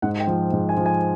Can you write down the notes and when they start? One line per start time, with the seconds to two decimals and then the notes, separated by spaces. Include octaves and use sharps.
0.02 G#2 F#5
0.20 G5
0.27 F3
0.53 G#2
0.69 G#5
0.77 F3
0.86 G#5